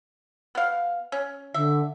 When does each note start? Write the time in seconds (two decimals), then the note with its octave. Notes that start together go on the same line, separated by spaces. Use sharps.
0.55 B3 F5
1.12 C#4
1.54 D3 E5